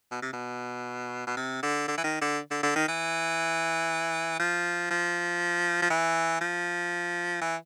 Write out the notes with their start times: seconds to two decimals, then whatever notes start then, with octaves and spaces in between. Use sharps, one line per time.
0.12 B2
0.22 C3
0.33 B2
1.27 B2
1.37 C3
1.63 D3
1.88 D3
1.98 E3
2.04 D#3
2.21 D3
2.51 D3
2.63 D3
2.76 D#3
2.88 E3
4.40 F3
4.91 F3
5.82 F3
5.90 E3
6.41 F3
7.41 E3